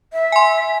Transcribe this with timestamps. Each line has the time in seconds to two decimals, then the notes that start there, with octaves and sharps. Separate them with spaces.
0.13 E5
0.32 G#5 C6